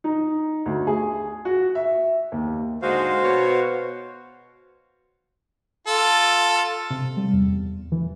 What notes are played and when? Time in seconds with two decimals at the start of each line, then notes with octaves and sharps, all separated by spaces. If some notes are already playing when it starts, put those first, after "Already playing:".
0.04 D#4
0.66 D2
0.87 G#4
1.45 F#4
1.75 E5
2.32 D#2
2.82 G#2 D3 G#3 F#4 C5 F5
3.23 B2 C#5
5.87 F4 A4
6.90 C3
7.17 G3
7.33 E2
7.92 E3